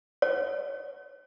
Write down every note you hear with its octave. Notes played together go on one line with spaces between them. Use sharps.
C#5